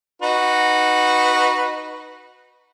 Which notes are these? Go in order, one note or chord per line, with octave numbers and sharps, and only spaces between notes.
D#4 F#4 B4